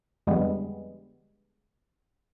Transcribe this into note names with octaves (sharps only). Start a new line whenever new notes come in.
F2 D3 G3 G#3 B3